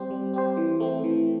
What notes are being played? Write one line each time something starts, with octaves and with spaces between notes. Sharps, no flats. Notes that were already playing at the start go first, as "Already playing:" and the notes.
Already playing: G3 C4 G4 C5
G3
C4 G4 C5
E3
A3 C4
E3